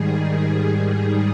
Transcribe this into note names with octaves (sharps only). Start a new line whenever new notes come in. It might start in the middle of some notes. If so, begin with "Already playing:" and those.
Already playing: G#2 D#3 G3 G#4
G#4